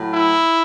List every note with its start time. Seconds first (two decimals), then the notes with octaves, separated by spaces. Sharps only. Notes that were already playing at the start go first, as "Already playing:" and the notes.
Already playing: A2 F#3
0.12 E4